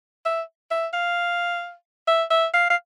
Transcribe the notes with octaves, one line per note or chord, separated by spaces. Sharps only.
E5
E5
F5
E5
E5
F5
F5